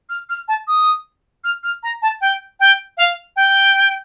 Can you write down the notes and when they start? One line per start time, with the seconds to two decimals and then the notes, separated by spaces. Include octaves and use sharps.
0.09 F6
0.30 F6
0.48 A5
0.67 D#6
1.44 F6
1.63 F6
1.83 A#5
2.02 A5
2.21 G5
2.60 G5
2.97 F5
3.36 G5